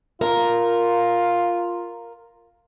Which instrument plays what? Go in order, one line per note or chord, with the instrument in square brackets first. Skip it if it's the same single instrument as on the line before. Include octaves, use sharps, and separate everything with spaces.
[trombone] F4 [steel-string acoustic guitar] A#4